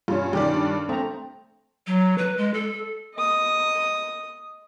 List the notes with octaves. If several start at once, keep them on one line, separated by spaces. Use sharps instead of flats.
G2 C#4 F4
G2 D#3 G4 D5
D4
A3 C4 A#5
F#3
B4
G#3
A4
D#5 D#6